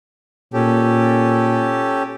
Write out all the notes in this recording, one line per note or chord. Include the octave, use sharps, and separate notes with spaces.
A#2 C#4 G4 A4